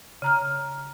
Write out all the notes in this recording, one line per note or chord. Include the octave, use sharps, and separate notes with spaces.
C#3 A#5 F6